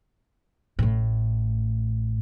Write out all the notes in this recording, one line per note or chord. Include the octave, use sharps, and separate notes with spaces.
A1 A2